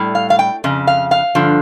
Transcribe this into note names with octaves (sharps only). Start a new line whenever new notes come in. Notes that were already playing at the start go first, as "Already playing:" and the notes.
Already playing: A2 G3
F5
F5
G5
F2 C#3
F5
F5
G2 D3 F3